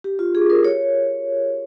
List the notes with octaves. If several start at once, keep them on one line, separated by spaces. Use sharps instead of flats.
G4
F4
G#4
A#4
C#5